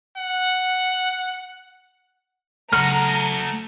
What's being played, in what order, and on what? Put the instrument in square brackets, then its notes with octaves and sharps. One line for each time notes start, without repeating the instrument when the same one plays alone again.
[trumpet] F#5
[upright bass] C#3 F#3 [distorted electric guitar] A3 F#5 [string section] A#5 [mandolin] F6